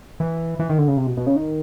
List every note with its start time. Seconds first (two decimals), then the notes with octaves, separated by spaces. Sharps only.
0.20 E3
0.59 E3
0.69 D#3
0.78 D3
0.88 C#3
0.97 C3
1.07 B2
1.17 B2
1.26 C#3
1.36 D#3